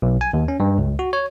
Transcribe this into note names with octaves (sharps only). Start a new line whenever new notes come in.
B1
G#5
D#2
C#4
G2
C#2
F#4
C#5